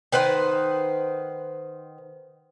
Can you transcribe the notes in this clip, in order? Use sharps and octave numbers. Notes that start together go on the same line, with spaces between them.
D#3 B4 C5 F#5